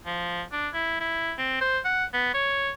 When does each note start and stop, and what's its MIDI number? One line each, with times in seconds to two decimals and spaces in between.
0.06 0.42 53
0.52 0.68 62
0.74 0.96 64
1.00 1.33 64
1.38 1.58 60
1.61 1.79 72
1.85 2.05 78
2.14 2.31 59
2.34 2.72 73